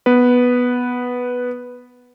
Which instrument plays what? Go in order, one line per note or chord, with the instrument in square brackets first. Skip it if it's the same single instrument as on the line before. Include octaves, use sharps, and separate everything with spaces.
[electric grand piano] B3 B4